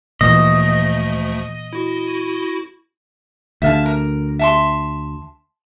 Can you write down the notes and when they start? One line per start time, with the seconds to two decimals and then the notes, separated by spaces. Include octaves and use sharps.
0.21 D2 A#2 E3 F3 A3 D#5
1.73 E4 F#4
3.62 D2 D3 E5 F5 A5
3.86 A#4
4.39 E5 A5 C6